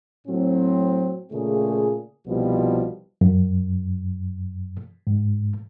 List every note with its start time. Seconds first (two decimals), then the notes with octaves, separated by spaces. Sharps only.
0.28 A2 F#3 C4
1.31 A#2 C#3 A3 G#4
2.27 C2 B2 F3 G3
3.21 F#2
5.07 G#2